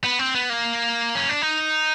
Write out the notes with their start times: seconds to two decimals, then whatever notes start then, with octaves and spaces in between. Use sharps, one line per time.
0.04 B3
0.19 C4
0.35 B3
0.50 A#3
1.15 C#4
1.29 D4
1.42 D#4